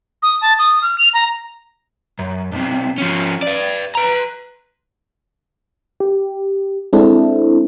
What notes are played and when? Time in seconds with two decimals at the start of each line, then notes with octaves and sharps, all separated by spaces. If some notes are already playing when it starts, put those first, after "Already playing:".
0.23 D#6
0.41 A5
0.59 D#6
0.82 F6
0.98 F7
1.14 A#5
2.19 F#2
2.52 B1 C3
2.98 F3 C#4
3.43 B4 D5
3.95 B4 A#5
6.00 G4
6.93 G#3 C4 D4 E4 A4